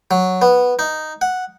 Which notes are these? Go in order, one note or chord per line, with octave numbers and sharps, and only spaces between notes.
F#3
B3
D#4
F#5